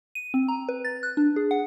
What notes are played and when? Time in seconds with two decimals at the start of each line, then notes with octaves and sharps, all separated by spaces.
0.15 D#7
0.34 C4
0.48 A#5
0.69 B4
0.85 A6
1.03 F#6
1.17 D4
1.36 G#4
1.51 F#5